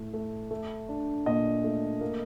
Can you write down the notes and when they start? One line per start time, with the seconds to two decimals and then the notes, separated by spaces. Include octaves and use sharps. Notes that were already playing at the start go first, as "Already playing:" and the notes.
Already playing: A2 A3
0.13 A3
0.51 A3
0.89 D4
1.26 A#2 D#5
1.64 A3
2.01 A#3